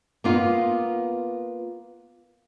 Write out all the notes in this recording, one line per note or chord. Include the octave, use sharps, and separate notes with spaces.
A#3 B3 F4